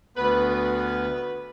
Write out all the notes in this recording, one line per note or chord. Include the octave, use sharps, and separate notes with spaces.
D2 B3 B4
B4